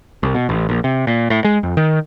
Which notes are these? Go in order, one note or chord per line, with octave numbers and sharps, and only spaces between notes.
C2
B2
A1
A#1
C3
A#2
A2
G#3
F2
D#3